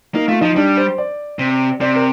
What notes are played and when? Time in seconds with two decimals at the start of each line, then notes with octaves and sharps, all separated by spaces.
0.15 A#3 D#4
0.28 A3 F4
0.41 F3 D#4
0.56 G3 D4
0.77 C5
0.98 D5
1.39 C3
1.81 C3 D5
1.95 A#4